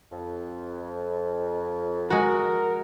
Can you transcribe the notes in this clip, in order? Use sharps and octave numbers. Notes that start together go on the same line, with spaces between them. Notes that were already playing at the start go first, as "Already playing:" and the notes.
F2
G#3 F#4 A#4